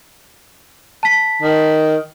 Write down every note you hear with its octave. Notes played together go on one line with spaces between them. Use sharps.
A5 B6
D#3